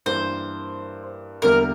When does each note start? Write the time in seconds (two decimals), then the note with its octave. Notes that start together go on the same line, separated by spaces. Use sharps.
0.06 G2 E3 A#3 C5
1.42 E2 D3 G3 A#3 E4 A#4